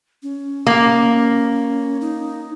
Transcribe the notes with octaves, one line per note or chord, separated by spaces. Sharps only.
C#4
A#3
D#4